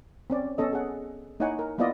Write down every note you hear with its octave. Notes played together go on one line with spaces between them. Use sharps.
C4 C#4 D5
B3 C#4 A4 D#5
G#4 F#5
A#3 D#4 E4 C#5 F#5 G#5
A#4
A#3 B3 E4 F4 D5 D#5